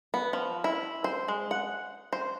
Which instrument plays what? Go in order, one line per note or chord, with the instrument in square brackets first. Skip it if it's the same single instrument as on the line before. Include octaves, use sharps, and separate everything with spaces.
[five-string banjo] B3
F3
E4
C5
G#3
F#5
C5